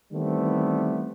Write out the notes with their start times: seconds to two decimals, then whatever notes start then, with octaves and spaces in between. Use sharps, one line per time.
0.12 D#3 E3 G3 A3 B3 C4